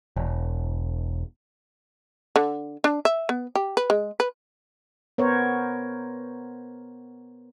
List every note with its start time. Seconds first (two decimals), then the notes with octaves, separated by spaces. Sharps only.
0.16 E1
2.36 D3
2.84 D4
3.05 E5
3.29 B3
3.55 G4
3.77 B4
3.90 G#3
4.20 B4
5.18 B3 A#4 C5 C#5